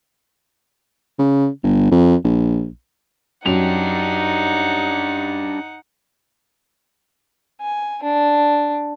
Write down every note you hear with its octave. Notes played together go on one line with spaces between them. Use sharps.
C#3
G1
F2
A#1
F#2 D4 D#4 G4 F#5 F7
G#5
D4